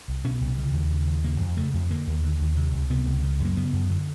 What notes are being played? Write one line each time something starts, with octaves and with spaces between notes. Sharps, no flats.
C2
B2 C#4
C2
C#3
D#2
C#3
D#2
C#3 A#3
F2
C#3 A3
F2
D3 A#3
D#2
D3
D#2
C3
C#2
C3 B3
C#2
C#3
F#2 A#3
C#3 B3
F#2
D3